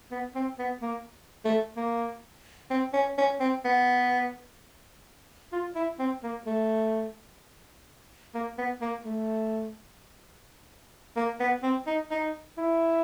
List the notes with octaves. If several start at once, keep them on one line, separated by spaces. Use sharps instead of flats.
B3
C4
B3
A#3
A3
A#3
C4
C#4
C#4
C4
B3
F4
E4
C4
A#3
A3
A#3
B3
A#3
A3
A#3
B3
C4
D#4
D#4
E4